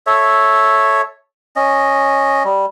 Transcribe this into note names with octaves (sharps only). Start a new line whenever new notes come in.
A4 C#5 E5
C#4 D#5
G3